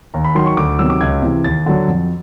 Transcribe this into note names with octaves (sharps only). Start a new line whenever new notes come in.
D#2 A#5
B5
D#3 F#3 C6
C#6
D2 D6
C3 D#3 F#3 E6
D6
C#2 G#6
C3 E3
D#2 A6
D3 F#3
F2